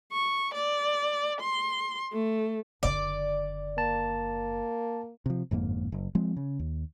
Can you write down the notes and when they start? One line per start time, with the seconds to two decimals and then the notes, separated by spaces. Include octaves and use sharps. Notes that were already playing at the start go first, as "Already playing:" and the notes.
0.13 C#6
0.54 D5
1.41 C6
2.12 A3
2.83 F#1 D3 D5
3.78 A#3 A5
5.26 C3 F3
5.51 G1 F2 G#2 A#3
5.92 F#1
6.15 F3 G#3 C4
6.36 C#3
6.59 D#2